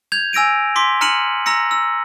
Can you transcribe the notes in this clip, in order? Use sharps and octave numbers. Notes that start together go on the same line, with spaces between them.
G6 G#6 F7
G#5 E6 A#6 D7 D#7
C6 D6 B6
A#5 F6 C#7 D#7 F#7
A#5 E6 A#6 C#7
E6